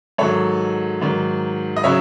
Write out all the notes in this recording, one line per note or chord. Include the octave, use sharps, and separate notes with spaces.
G#2 D#3 F#3 A4 C#5
G#2 D#3 F#3
D#5
C#3 F#3 C#5 E5